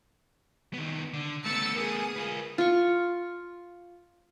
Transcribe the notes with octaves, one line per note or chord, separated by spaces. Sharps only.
D#3 B3
D3
A3 B3 E6 A6 C#7
G#4 A#4 D#6
F4 B4
F4 C#6